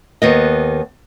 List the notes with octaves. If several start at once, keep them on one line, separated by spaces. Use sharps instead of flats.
D#2 B3 D#5